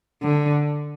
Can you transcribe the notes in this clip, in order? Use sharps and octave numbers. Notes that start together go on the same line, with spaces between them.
D3